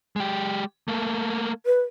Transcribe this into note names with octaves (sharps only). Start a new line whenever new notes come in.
G#3 G4
A3 A#3
B4